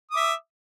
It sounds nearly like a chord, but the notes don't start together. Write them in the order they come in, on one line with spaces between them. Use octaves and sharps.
D#6 D6 E5